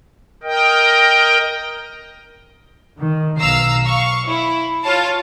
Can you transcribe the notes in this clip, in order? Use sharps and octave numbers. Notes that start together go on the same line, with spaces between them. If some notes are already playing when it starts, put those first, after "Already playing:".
A#4 D#5 G5
D#3
B1 F5 A#5 E6 C7
F5 C#6
E4
F4 C#5 F5 A5